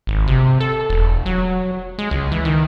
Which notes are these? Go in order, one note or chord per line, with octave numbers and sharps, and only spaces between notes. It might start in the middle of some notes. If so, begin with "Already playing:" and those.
G#1
C3
A4
E1
F#3
G#3
C#2
E3
D#3